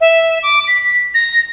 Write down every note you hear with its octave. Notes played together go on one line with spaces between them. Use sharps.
E5
D6
B6
A#6